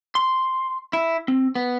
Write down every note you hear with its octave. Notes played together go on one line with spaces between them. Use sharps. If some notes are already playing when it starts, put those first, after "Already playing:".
C6
E4
C4
B3